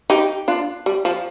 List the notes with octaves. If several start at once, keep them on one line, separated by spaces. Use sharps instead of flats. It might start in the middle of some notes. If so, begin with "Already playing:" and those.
D#4 G4
D4 F4
G3
F3